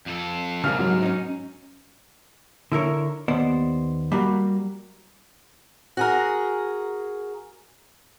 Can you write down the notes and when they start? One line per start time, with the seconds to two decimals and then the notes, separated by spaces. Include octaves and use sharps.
0.06 F2 D4 A4
0.64 G#2 C#3 G3 A#3 F6
0.79 F#3
1.02 C#4 D#4
2.72 D3 E4 A#4 C#5
3.28 D#2 B3 C5 D5
4.12 G3 A#3 F#4
5.97 F#4 G#4 A#4